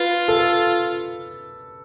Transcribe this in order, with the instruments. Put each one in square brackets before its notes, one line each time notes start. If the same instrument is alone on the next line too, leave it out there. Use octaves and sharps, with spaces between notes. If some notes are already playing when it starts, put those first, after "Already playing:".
Already playing: [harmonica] F4 [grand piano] B4
[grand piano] A4